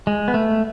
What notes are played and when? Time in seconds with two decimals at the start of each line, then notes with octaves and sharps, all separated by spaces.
0.07 G#3
0.28 B3
0.34 A3